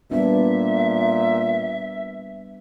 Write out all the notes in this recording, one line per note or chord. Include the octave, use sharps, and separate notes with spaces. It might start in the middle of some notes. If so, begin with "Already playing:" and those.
A#2 G3 B3 D4 E5